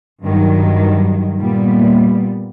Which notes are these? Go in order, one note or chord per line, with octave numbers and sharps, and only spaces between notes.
G2 D#3 F#3
A#2 G3 B3